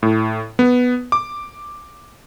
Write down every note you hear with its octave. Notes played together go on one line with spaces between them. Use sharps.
A2
B3
D6